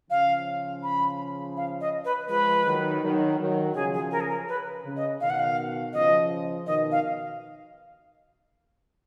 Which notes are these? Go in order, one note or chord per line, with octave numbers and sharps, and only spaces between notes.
C#3 F3 F5
B5
F5
D#5
B4
F3 G#3 B4
D#3 F#3
D#3 F#3
D#3 F#3
C#3 F3 G#4
G#4
A#4
G#4
A#4
B4
C#3
D#5
B2 D#3 F5
F#5
F5
C#3 F3 D#5
B2 D#3 D#5
F5